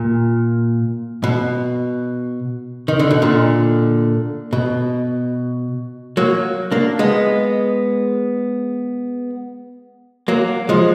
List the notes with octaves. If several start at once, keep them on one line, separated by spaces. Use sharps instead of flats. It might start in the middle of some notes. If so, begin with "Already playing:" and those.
Already playing: A#2
B2
D#3
D3
B2
A#2 D3
B2
F#3 A#3
A#3 D4
G#3 B3
F#3 A#3
F3 G#3